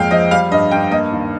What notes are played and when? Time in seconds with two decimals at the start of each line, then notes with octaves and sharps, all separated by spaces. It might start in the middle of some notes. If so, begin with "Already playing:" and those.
Already playing: F2 G#3 A#3 F5 G5
0.11 F3 D#5
0.31 G3 F5
0.51 G2 D#5
0.71 G2 G5
0.91 A#3 D#5
1.12 D#2